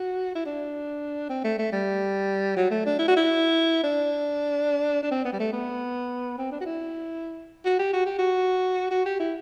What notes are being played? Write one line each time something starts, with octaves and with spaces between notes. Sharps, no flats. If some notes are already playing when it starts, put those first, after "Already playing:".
Already playing: F#4
E4
D4
C4
A3
A3
G3
F#3
A3
D4
E4
F#4
E4
D4
D4
C4
B3
G3
A3
B3
C4
D4
F#4
E4
F#4
G4
F#4
G4
F#4
F#4
G4
E4